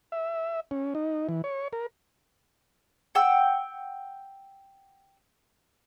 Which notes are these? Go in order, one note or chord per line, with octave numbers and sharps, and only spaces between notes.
E5
C#4
D#4
E3
C#5
A#4
F#5 G5 E6